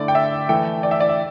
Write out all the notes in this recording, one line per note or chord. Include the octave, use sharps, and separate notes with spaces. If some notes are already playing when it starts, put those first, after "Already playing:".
Already playing: D3 A3 E4 D5
G5
E5
E3 A3 E4 G5
D5
E5
D5
E5